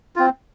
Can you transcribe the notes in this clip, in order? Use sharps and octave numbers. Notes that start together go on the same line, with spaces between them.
C4 F4